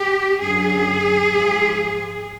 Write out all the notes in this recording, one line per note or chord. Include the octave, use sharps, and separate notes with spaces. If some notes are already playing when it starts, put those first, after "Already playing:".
Already playing: G4
F#2 D3 F#3 G#4
G#2 F3